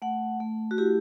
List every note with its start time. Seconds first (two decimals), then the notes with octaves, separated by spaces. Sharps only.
0.02 A3 F#5
0.40 A3
0.71 F#4
0.78 E4 G4